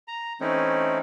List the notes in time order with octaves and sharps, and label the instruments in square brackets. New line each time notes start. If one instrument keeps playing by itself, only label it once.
[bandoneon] A#5
E3 A3 C4 C#4 D#4 E4